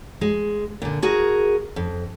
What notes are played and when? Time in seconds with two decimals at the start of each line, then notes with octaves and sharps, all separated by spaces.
0.21 G#3
0.82 A#2 D3
1.02 F#4 G#4 A#4
1.76 F2